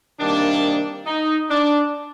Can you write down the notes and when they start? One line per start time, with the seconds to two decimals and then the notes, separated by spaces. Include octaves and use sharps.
0.19 C3 D#3 G3 A#3 D4
1.06 D#4
1.50 D4